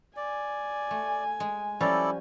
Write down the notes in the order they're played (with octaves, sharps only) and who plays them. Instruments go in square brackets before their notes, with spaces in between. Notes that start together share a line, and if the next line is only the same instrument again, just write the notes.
[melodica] D5 [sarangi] G#5
[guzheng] A3
G#3
[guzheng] F3 G3 C#4 [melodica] E4 A4 D5